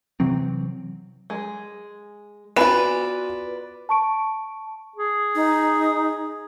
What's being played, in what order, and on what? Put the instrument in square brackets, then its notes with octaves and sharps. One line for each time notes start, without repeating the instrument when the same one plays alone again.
[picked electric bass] C3 E3 F#3 C4
[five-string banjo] G#3
[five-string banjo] B3 G#5 [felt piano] F4 F#4 E7 [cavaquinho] B4 D5
[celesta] A5 C#6 D7
[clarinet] G#4
[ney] D#4